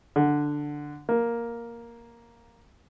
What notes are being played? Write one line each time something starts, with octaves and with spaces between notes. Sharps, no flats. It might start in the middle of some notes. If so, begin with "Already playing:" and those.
D3
A#3